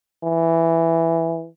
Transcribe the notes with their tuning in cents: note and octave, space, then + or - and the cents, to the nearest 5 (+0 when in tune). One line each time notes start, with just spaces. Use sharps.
E3 +5